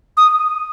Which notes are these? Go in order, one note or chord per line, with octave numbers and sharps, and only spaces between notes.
D#6